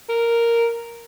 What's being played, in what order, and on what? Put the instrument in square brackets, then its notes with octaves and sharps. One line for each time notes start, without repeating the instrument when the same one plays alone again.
[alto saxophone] A#4